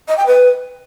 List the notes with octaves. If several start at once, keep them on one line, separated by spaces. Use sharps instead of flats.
D#5
G5
B4